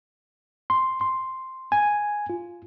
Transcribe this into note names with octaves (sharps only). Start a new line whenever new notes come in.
C6
C6
G#5
F4